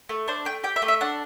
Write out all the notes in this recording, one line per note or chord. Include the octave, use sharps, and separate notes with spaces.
A3
D4 C5
A3 G5
G4 G5
E5
A3
E5
D4 F#5